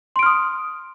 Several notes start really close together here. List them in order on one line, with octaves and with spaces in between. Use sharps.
C6 D7 F6 D#6